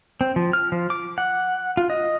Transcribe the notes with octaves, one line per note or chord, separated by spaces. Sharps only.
C4
F3
F6
F3
D6
F#5
F4
D#5